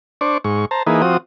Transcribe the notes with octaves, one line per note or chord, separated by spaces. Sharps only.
D4 C5 D5 C#6
G#2 C#6
C5 A5 A#5
E3 A#3 D#4 G#4 B4
F3 C4 F#4 D#6